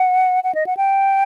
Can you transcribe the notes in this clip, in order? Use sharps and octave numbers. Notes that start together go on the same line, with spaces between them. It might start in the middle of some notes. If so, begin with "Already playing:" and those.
Already playing: F#5
F#5
D#5
F#5
G5